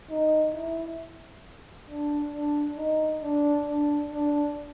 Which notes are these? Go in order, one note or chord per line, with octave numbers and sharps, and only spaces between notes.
D#4
E4
D4
D4
D#4
D4
D4
D4